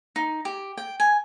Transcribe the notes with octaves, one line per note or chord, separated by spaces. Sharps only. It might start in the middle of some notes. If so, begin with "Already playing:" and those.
D#4
G4
G5
G#5